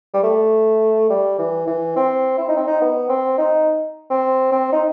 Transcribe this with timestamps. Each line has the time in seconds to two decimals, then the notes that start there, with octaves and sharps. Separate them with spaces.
0.14 G3
0.23 A3
1.10 G3
1.39 E3
1.67 E3
1.96 C4
2.38 E4
2.48 D#4
2.57 C4
2.67 D#4
2.82 B3
3.09 C4
3.38 D#4
4.10 C4
4.52 C4
4.72 D#4